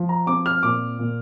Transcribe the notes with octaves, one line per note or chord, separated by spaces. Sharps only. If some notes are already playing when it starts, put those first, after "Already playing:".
Already playing: F3
A#5
C4 D6
F6
A#2 D6
A#2